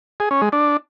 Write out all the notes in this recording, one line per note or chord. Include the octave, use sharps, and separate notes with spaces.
G#4
C#4
G#3
D4